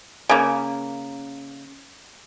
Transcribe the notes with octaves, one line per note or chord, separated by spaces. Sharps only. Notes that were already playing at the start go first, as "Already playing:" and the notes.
C#3 A#3